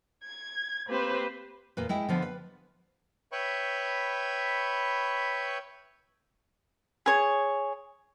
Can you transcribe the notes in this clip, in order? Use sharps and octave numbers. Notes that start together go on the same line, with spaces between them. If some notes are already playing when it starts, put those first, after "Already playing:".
G#6
A#3 C4 G4 B4 C5
E2 A#2 B4
G#3 E4 G5
D3 F3 B3
B4
B4 C#5 E5 G5 B5 C#6
G#4 C#5